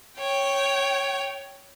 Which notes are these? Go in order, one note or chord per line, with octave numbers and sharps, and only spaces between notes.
C#5 G5